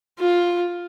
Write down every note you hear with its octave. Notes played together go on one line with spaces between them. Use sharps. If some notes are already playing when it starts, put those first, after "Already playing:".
F4